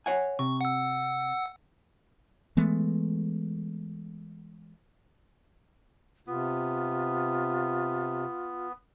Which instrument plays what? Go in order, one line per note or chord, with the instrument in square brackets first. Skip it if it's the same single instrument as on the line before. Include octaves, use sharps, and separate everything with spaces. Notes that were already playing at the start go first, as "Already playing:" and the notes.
[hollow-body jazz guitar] C#5 F#5 G#5
[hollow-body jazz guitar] C3 [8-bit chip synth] C#6
[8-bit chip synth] F#5 E6
[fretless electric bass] E3 G#3 A3 B3
[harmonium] C3 [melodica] B3 [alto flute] F4